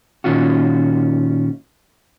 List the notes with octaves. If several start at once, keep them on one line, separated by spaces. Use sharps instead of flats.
A#2 D#3 C#4 F4 F#4